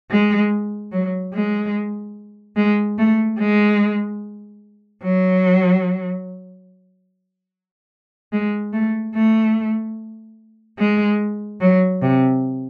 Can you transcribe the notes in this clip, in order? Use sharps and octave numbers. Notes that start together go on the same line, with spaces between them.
G#3
F#3
G#3
G#3
A3
G#3
F#3
G#3
A3
A3
G#3
F#3
C3